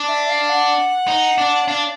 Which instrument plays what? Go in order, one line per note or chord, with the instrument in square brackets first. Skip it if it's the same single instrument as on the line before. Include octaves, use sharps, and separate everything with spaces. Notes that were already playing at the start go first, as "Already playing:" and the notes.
Already playing: [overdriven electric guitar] D4
[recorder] E5
F5
F#5
[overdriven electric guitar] D#4
D4
[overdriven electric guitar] D4 [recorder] F5